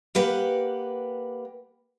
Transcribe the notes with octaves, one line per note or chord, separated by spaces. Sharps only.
A#3 G4 B4 F#5